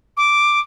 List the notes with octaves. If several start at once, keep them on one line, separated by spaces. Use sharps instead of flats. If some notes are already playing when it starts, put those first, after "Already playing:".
D6